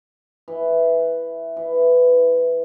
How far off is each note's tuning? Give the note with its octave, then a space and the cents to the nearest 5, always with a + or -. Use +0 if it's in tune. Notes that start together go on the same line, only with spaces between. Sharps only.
E3 +0
E3 +10